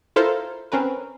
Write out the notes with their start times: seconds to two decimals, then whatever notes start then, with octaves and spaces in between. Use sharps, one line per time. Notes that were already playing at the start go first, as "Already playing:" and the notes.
0.16 E4 F4 A4 A#4 C5
0.72 C4 C#4 A#4 B4